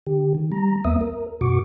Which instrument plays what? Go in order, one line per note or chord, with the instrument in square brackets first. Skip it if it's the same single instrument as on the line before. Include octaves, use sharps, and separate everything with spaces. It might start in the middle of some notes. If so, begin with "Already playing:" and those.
[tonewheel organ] D3 G4
D#3
G3 A#5
E2 A#3 B3 E5 D#6
A#4
F#2 B2 F#4 C#6 D6